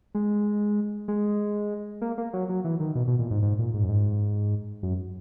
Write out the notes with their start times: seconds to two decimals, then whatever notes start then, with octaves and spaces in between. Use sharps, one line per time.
0.15 G#3
1.08 G#3
2.01 A#3
2.18 A#3
2.33 F#3
2.49 F#3
2.64 E3
2.80 D#3
2.95 B2
3.07 B2
3.19 A#2
3.31 G#2
3.43 G#2
3.59 A#2
3.74 G#2
3.83 F#2
3.89 G#2
4.83 F#2